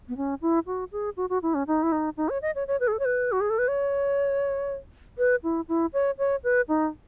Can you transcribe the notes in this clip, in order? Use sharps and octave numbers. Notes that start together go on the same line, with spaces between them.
B3
C#4
E4
F#4
G#4
F#4
F#4
E4
C#4
D#4
E4
D#4
D#4
C#5
D#5
C#5
C#5
B4
G#4
A4
C#5
B4
F#4
G#4
A4
B4
C#5
B4
E4
E4
C#5
C#5
B4
D#4